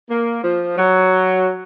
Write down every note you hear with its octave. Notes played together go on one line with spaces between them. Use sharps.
A#3
F3
F#3